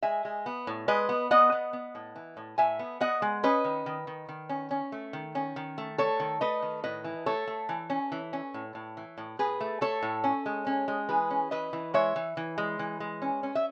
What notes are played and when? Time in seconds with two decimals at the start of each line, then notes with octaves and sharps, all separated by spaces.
0.02 G#3 E5 G#5
0.25 G#3
0.46 B3
0.67 A2
0.88 G#3 B4 D#5
1.09 B3
1.31 B3 D#5 F#5
1.52 B3
1.73 B3
1.95 A2
2.16 E3
2.37 A2
2.58 A2 E5 G#5
2.79 B3
3.00 B3 D#5 F#5
3.22 G#3
3.43 C#4 B4 D#5
3.64 D#3
3.86 D#3
4.07 D#3
4.29 D#3
4.49 C#4
4.71 C#4
4.92 A3
5.13 D#3
5.35 C#4
5.56 D#3
5.78 A3
5.98 A3 A4 C#5
6.20 D#3
6.41 A3 B4 D#5
6.62 D#3
6.84 A2 B4 D#5
7.04 E3
7.26 A3 A4 C#5
7.47 A3
7.69 E3
7.90 C#4
8.12 E3
8.33 C#4
8.54 A2
8.75 A2
8.97 E3
9.18 A2
9.39 A2 G#4 B4
9.60 A3
9.81 A3 A4 C#5
10.03 A2
10.24 C#4
10.46 G#3
10.67 C#4
10.88 G#3
11.09 E3 G#4 B4
11.30 C#4
11.51 E3 B4 D#5
11.73 E3
11.94 G#3 C#5 E5
12.16 E3
12.37 E3
12.58 G#3
12.79 E3
13.00 G#3
13.22 C#4
13.43 C#4
13.55 E5